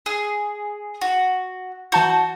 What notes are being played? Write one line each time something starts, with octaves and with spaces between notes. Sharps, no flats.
G#4
F#4
E3 F#4 A5 G6